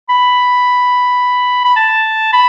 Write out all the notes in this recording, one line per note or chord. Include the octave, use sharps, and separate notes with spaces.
B5
B5
A5
B5